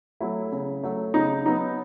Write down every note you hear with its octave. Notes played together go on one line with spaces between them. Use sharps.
F#3 A3 E4
C#3
F#3 A3
C#3 D#4
F#3 B3 D#4